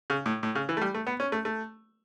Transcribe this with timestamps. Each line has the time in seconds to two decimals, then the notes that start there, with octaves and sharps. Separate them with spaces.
0.10 C#3
0.26 A2
0.43 A2
0.55 C#3
0.69 E3
0.77 A3
0.82 G3
0.95 A3
1.07 B3
1.20 C#4
1.32 A3
1.45 A3